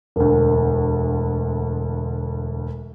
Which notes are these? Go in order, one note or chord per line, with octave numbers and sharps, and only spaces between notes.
E1 D2